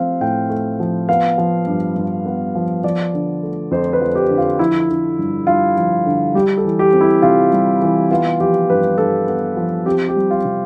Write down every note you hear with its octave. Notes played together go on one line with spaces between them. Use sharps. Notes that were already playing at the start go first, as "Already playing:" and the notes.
Already playing: F3 A3 C4 F5
A2 G5
A3
F3
B3 F5
F3
G2
G2
B3
F3
F3 D5
D3
A3
F2 C5
B4
F3
G4
D3
F4
F3 E4
D3
G2
G2 F4
F3
D3
G3 G4
A4
E3
G4
C4
E4
C3 F4
G3
E3
B3 F4
F3 G4
G2 B4
G2 A4
B3
F3
C4 G4
G4
G3
F4
C3